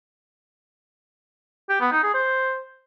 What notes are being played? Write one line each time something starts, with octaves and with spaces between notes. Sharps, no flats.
G4
B3
D#4
G#4
C5